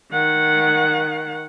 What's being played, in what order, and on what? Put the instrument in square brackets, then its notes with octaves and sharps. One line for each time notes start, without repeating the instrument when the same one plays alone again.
[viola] D#3 F#5